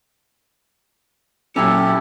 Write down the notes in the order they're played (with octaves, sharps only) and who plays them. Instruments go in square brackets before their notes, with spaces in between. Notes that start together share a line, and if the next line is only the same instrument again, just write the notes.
[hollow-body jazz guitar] A#2 F#3 C#4 [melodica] E4 G4 A4